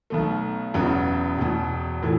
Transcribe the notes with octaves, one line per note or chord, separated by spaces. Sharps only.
B1 B2 A3
E1 E2 C#3 F#3 B3
E1 E2 B2
A2 E3 A3 E4